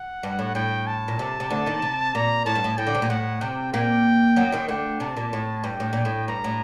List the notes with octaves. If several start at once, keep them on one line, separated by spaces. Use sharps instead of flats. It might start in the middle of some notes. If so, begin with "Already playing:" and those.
Already playing: F#5
G2
A2
A2 G5
A5
A#2
C3
C3
D2 D3
D#2 D#3
C3
A#2 A#5
A2 A5
G2
A2
A2 G5
D3
C3
A#2
A2 F#5
C3 G5
A#2 A#3 G5
F#2 F#3
D#2 D#3
D2 D3 G5
C3 A5
A#2
A2
G2 G5
A2
A#2
A2
G2 A#5
A2